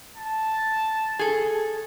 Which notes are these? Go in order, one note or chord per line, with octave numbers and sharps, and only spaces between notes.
A5
G#4 A4